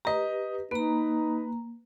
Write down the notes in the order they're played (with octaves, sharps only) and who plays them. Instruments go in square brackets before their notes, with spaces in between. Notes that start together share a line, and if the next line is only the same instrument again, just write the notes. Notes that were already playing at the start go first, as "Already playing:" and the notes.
[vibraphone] G4 B4 [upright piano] D#5 A#5
[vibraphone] A#3 A#5 [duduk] D#4 [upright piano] B4